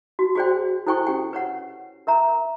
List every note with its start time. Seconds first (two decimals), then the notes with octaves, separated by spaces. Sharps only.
0.19 F#4
0.35 F#4 G#4 C5 D5 G5
0.87 E4 A4 C5 G5 G#5 C#6
1.07 C#4 G4 G5
1.33 B4 C#5 F#5
2.07 A#4 E5 A#5